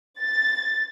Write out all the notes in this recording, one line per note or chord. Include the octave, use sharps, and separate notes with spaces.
A6